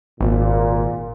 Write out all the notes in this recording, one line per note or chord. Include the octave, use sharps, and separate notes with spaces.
G#1 A#2